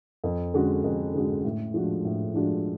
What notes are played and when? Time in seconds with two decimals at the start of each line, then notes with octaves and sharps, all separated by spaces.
0.24 F2
0.54 D3 G#3 C#4 F#4
0.84 F2
1.14 D3 G#3 C#4 F#4
1.45 A2
1.74 F3 G#3 D4 F#4
2.05 A2
2.34 F3 G#3 D4 F#4